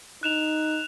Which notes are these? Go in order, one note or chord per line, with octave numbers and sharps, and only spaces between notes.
D#4 F#6 E7 F7